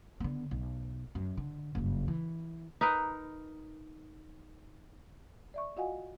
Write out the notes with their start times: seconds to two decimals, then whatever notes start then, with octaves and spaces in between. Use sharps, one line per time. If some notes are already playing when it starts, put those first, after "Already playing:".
0.20 D3 B3
0.51 B1
1.15 F#2
1.37 D3
1.75 F#1 G2
2.08 E3
2.81 D#4 A#4 B4 D#5
5.54 D5 E5 C#6
5.77 F4 F#4 D#5 F5 F#5 G#5